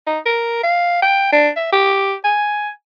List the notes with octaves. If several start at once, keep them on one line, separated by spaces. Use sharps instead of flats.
D#4
A#4
F5
G5
D4
E5
G4
G#5